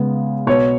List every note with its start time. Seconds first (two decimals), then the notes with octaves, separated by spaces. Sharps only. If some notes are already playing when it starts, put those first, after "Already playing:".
Already playing: C#3 G#3 B3
0.47 B2 B3 C#5